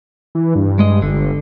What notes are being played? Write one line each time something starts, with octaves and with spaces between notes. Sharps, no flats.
E3
G2
G#3 D#5
G1 D3